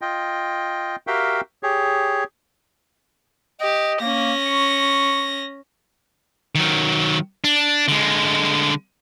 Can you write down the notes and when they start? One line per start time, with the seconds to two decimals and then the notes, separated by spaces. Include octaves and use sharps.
0.02 F4 D#5 G5
1.07 F#4 G4 A#4 E5 F5 G5
1.63 G4 G#4 C#5
3.61 G4 D#5
4.01 A#3 C#4 A#6
4.46 C#6
6.55 D#3 F#3
7.44 D4
7.88 D3 G#3